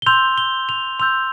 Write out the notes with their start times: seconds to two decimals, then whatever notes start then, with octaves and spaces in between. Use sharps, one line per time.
0.02 G7
0.06 C6 E6 G6 F7
0.38 G7
0.69 F7
1.00 C6 E6 G6 F7